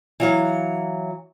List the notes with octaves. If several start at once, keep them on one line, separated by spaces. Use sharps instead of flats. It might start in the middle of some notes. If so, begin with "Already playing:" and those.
E3 F#3 F5